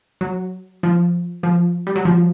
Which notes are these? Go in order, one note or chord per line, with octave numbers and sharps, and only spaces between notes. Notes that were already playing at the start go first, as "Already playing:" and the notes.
F#3
F3
F3
G3
F#3
F3